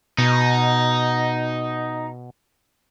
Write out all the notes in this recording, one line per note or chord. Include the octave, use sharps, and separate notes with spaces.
B2 D#4